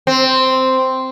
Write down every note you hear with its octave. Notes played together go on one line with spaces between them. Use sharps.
C4